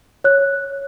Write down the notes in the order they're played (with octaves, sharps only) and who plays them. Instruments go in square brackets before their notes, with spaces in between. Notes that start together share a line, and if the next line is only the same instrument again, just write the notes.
[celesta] C#5 F#6